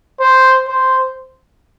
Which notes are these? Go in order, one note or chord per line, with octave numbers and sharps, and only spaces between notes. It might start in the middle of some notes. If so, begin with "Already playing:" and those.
C5
C5